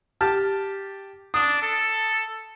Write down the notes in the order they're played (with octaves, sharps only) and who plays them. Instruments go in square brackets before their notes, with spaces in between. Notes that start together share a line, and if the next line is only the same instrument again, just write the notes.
[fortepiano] G4 A5 F6
[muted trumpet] D4 [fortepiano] D#6
[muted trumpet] A4